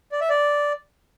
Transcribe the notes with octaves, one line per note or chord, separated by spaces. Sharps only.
D5
E5
D5